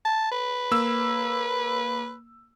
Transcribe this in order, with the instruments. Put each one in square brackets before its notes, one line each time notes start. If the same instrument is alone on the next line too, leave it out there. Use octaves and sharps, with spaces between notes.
[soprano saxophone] A5
B4
[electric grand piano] A#3 E6